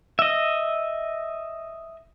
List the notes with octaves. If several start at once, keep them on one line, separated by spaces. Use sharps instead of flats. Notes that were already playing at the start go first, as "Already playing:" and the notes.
D#5 E5